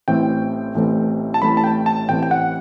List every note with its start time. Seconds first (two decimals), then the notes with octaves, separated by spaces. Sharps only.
0.08 A1 A2 E3 A3 C4 G5
0.75 A1 A2 E3 A3 C4
1.34 A5
1.42 A1 A2 E3 A3 C4 B5
1.57 A5
1.64 G5
1.86 A5
2.09 A1 A2 E3 A3 C4 G5
2.23 G5
2.31 F#5